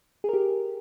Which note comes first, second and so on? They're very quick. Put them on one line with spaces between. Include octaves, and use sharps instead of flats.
G#4 A#4 G4